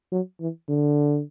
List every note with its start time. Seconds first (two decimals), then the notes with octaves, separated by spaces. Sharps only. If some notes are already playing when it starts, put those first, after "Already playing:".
0.12 F#3
0.41 E3
0.69 D3